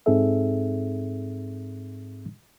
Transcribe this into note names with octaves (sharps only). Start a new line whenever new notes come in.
G#2 C4 D#4 G#4 A4 E5